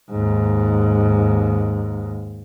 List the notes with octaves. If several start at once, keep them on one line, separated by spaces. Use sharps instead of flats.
D#2 G#2